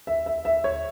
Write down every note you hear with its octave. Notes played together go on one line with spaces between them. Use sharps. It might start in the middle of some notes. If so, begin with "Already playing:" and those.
E5
E5
E5
C#5